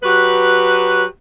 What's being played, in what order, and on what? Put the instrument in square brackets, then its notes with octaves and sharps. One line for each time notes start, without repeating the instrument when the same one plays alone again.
[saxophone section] F#3 F#4 G4 B4